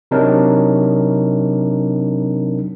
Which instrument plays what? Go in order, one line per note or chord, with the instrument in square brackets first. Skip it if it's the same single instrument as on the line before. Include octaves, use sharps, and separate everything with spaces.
[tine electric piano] C3 F#3 C4 D4 D#4 A#4